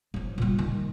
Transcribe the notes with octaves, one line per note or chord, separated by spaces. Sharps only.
F3 F#3
A#2 G3
D#3